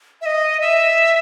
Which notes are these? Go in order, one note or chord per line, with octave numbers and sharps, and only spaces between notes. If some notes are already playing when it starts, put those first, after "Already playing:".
E5
D#5
E5